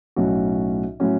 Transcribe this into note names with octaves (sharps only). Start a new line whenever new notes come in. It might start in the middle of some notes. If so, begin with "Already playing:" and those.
B1 A2 F#3 C#4 F#4
A2 F#3 C#4 F#4